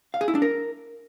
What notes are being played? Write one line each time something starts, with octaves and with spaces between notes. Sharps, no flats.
F5
G#4
E4
D4
A#4